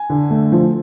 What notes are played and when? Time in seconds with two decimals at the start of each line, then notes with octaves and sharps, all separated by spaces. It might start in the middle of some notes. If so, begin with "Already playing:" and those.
Already playing: G#5
0.10 D3
0.30 A3
0.52 F3